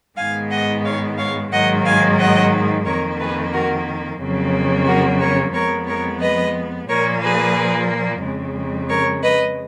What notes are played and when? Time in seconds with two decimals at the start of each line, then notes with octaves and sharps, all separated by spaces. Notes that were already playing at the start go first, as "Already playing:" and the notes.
0.17 G#2 D#3 G#3 B3 F5 G#5
0.50 D#5 F#5
0.84 C#5 F5
1.17 C#5 F5
1.51 G#2 D#3 F#3 A#3 D#5 F#5
1.84 F5 G#5
2.18 D#5 F#5
2.85 F2 D#3 A#3 A#4 C#5
3.19 G#4 B4
3.52 F#4 A#4
4.19 F2 C#3 F#3 A#3
4.87 F#4 A#4
5.20 A#4 C#5
5.53 F2 F3 G#3 B3 A#4 C#5
5.87 A#4 C#5
6.21 B4 D#5
6.88 A#2 F3 A#3 A#4 C#5
7.21 G#4 B4
8.22 F2 C#3 G#3
8.89 A#4 C#5
9.22 B4 D#5